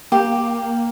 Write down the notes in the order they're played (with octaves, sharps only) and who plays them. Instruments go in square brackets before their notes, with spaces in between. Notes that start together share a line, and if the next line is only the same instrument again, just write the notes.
[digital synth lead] A#3 [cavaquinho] G4